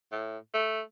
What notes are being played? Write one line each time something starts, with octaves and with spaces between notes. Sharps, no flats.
A2
A3